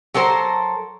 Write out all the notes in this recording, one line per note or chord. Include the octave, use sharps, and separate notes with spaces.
F#3 A4 A#4 C5